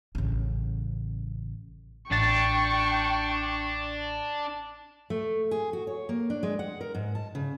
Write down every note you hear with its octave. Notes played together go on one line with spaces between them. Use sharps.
A1 C#3
A1 D4 G5 C#6 A6
A3
G#4
F#4
C#5
A#3
D4
G#3
F#5
A#4
G#2
A5
C#3